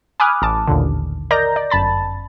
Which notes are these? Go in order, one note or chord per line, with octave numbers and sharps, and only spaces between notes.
G#5 B5 D6 D#6 F6 F#6
A1 A5 D6
A1 D#2 A#2 D3
A#4 D5 D#5 A#5 G6 A#6
D5
G1 F#2 A5 B5 A6